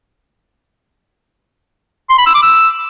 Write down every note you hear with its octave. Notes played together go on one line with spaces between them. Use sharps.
C6
B5
E6
D6
E6